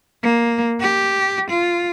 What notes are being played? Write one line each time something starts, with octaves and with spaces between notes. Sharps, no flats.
A#3
G4
F4